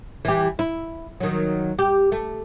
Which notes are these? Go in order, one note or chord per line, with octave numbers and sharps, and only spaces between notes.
E3 G4
E4
D#3 F#3
G4
A3